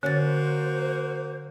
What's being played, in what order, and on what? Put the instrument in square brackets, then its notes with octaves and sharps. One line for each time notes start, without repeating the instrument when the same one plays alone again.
[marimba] D3 A6 [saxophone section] F#3 A#3 F#4 [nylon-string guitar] C#4 [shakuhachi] C5